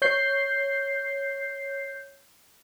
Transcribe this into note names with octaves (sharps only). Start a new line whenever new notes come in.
C#5 G6 C7